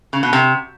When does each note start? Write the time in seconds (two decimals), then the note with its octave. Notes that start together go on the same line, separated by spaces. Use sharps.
0.13 C#3
0.23 B2
0.33 C3